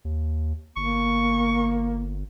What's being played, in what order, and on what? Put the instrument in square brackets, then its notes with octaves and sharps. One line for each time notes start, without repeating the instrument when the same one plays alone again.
[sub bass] D#2
[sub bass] G1 [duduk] A#3 [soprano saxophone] C#6